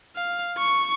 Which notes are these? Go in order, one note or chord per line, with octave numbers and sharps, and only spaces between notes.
F5
C#6